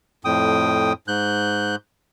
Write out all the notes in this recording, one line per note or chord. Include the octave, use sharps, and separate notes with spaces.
F2 A2 G5 D#6
G#2 F#6 G6